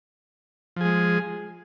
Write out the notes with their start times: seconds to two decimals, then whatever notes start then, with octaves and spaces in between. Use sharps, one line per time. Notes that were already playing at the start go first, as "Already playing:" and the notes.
0.76 F3
0.81 G#4
0.85 G#3